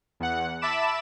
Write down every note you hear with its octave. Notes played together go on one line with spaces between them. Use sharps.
E2 F#5
E5 A5 B5 D6 E7